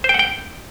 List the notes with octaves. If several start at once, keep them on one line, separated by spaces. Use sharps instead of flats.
C5
G5
F#5
G5